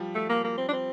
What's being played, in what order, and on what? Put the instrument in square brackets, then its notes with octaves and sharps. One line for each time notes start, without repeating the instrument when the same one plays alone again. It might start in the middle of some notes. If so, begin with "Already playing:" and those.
Already playing: [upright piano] F3 G3
[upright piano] F3 [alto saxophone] A3
[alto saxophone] A#3
A#3
C4
D4
C4